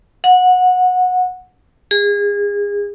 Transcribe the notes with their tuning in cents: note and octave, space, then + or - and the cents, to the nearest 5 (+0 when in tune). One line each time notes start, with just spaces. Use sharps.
F#5 -20
G#4 -30